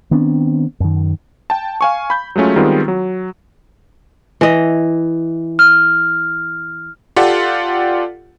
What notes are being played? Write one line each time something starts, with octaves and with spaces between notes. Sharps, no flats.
D#3 B3 C4 D4
F#2 D#3
G5 A5
F5 G#5 C#6
B5 G6
F#3 G#3 A3 C#4 F4
D#3 G3 G#3 B3 C4 F4
F#3
E3 D#5
F6
F4 G4 A4 D5 F#5